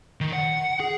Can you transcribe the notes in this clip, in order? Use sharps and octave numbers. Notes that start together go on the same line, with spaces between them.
D#3
F#5
G#4